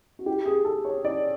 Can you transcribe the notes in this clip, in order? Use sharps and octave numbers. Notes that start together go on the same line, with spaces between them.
F#4
G4
G#4
A4
C#5
D5